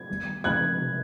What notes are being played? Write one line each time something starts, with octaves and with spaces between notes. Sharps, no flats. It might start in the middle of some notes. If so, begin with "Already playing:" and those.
Already playing: G#6
D#3 G3 B3
C#3 F3 G#3 C4 D#4 F#6 G#6
C3 D#3 G#3